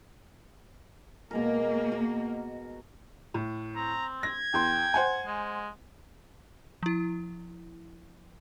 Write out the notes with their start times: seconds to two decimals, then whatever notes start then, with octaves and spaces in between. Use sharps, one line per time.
1.31 B2 G#3 A#3 A#4
1.92 F#4
3.34 A2
3.76 C4 A#5
4.23 G#6 A#6
4.54 E2 G5 C6
4.94 C5 F#5 G#5
5.26 G#3
6.83 F3 E4